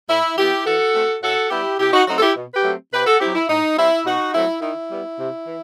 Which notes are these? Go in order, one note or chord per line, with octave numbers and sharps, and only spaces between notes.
A2 E4
E3 B3 E4 G4
E3 F#4 A4
A3 C4
A2 F#4 A4
G3 B3 E4 G4
C3 E4 G4
D#4 F#4
F#3 A3 C4 D#4 F#4
A4
E4 G4
B2
G4 B4
F#3 A3 C4
C3 G4 B4
F#4 A4
F#3 C4 E4 G4
E4
A2 D#4
G3 C4 E4
B2 D#4 F#4
F#3 A3 C4 E4
D#3 E4
G3 B3
C3
E3